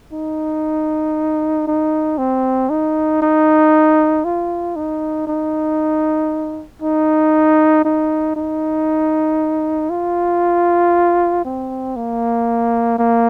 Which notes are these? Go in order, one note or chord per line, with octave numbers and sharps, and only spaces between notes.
D#4
D#4
C4
D#4
D#4
F4
D#4
D#4
D#4
D#4
D#4
F4
C4
A#3
A#3